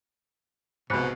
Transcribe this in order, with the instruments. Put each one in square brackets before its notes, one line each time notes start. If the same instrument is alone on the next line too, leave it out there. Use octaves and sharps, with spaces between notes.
[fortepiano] C2 G#2 [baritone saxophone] B2 [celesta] B5 F#6 C#7